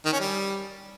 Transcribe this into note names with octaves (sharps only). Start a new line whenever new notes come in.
D#3
C#4
G3